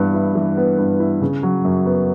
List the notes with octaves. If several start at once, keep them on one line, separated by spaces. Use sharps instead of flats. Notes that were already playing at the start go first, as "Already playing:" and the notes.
Already playing: G2 E3 B3
E4
E3
B3
G2
E4
C#3
F#3
F#2
B3